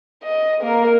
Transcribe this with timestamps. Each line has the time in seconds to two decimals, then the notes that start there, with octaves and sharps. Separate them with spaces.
0.23 D#5
0.61 A#3 A#4